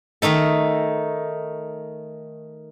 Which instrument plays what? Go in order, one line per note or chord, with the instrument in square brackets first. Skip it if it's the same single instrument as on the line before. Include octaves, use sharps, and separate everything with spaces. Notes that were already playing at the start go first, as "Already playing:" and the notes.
[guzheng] D#3 A3 D#4 A4